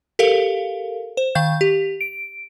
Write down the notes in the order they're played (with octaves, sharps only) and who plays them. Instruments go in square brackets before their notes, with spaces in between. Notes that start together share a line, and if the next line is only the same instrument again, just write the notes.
[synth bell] G4 A4 A#4 F5
C5
D#3 F5 G6
G4
D7